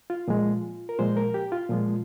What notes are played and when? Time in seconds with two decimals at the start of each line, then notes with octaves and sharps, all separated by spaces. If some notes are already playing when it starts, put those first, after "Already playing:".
0.10 F4
0.28 A#2 F3 G#3
0.89 A#4
0.99 A#2 F3 G#3 C5
1.17 A#4
1.34 G4
1.52 F4
1.70 A#2 F3 G#3